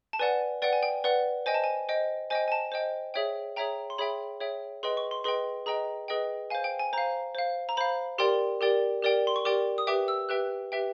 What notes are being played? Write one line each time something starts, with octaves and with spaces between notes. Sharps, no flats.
A5
B4 D5 F#5 G#5
B4 D5 F#5 G5
G#5
G5
B4 D5 F#5
C5 D#5 G5 G#5
A5
G#5
C5 D#5 G5
C5 D#5 G5 G#5
G#5
A5
C5 D#5 G5
G#4 C#5 E5 G5
G#4 C#5 E5 G5 A#5
C6
G#4 C#5 E5 G5 B5
G#4 C#5 E5 G5
G#4 B4 D#5 G5 C6
C#6
C6
G#4 B4 D#5 G5 C6
G#4 B4 D#5 G5 A#5
G#4 B4 D#5 G5
C5 F5 G#5
G5
G#5
C5 F5 A#5
C5 F5
A#5
C5 F5 B5
G4 A#4 D5 G5 C6
G4 A#4 D5 G5
G4 A#4 D5 G5
C6
C#6
G4 A#4 D5 G5 D6
D#6
G4 B4 E5 G5 D6
E6
G4 B4 E5 G5 F#6
G4 B4 E5 G5